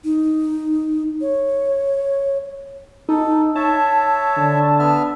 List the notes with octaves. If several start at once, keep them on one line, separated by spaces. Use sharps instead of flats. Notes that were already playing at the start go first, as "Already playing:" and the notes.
D#4
C#5
D#4 A4
C#5 E5 A5
D3
B3 E5 F6